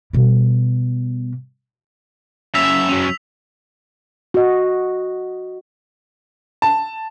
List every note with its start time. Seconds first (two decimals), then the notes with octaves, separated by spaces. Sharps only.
0.13 B2 G3
2.55 F#2 C#3 E5 E6 B6 F7
2.90 F#3 C#4
4.34 F#4 D#5
6.62 A5